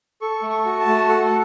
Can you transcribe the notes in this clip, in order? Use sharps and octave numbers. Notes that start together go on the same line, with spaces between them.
A4 C#6
A3
C#6
F#4
A5
A3
A4 F#5